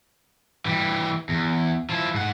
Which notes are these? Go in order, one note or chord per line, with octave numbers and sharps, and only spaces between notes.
E3 G3
E2
F3 E4
G#2 F#5